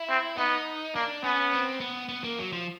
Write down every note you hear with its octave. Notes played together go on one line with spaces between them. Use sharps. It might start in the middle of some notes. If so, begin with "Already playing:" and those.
Already playing: E4
C4
B3 D#4
A#3 D4
B3 C#4
C4
B3
B3
A#3
F#3
F3